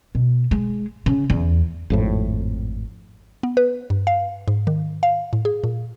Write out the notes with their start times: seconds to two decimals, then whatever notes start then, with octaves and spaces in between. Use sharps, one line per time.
0.15 B2
0.51 G#3
1.06 C#3
1.30 E2
1.90 G#1 F2 A2
3.43 B3
3.57 B4
3.90 G2
4.07 F5
4.48 G#2
4.67 D#3
5.03 F5
5.33 A2
5.45 G#4
5.64 A#2